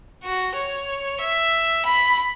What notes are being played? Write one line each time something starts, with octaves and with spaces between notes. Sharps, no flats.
F#4
C#5
E5
B5